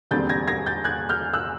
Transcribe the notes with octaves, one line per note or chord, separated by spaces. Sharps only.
E1 D#2 D3 G3 C4 G6 A6
G#6 A#6
G#6 A#6
G6 A6
F#6 G#6
F6 G6
E6 F#6